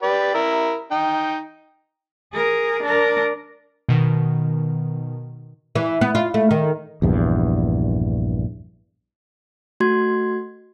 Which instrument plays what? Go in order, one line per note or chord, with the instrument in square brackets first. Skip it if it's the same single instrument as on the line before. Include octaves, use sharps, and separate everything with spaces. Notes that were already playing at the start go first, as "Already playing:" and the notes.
[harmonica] G4 B4 D5
E4 A#4
D#4 G5
[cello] G#4 A#4
D4 A#4
[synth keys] B2 D#3
[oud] E3
B3
F4
A3
D#3
[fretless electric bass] A#1 E2 G2
[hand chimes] A3 F#4 C6 G#6